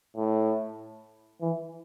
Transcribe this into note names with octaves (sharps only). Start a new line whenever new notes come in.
A2
E3